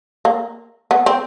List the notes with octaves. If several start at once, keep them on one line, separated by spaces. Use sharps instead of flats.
A#3
B3
C4